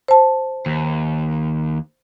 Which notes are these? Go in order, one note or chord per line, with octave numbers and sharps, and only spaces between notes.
C5 A5
D#2